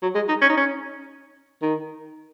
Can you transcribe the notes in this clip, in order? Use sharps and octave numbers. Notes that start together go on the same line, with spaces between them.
F#3
G#3
D#4
C#4
D#4
C#4
D#3